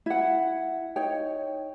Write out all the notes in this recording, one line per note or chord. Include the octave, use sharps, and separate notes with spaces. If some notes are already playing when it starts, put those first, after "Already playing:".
E4 F#5
D#4 C#5 G5